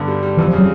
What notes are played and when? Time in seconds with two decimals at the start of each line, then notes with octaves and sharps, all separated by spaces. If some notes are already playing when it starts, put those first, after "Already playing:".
Already playing: G2 D3 B3
0.08 G3
0.23 G3
0.37 F2 E3
0.48 F3
0.53 C#3
0.58 F#3